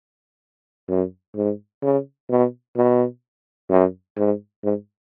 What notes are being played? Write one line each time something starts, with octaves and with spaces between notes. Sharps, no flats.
F#2
G#2
C#3
B2
B2
F#2
G#2
G#2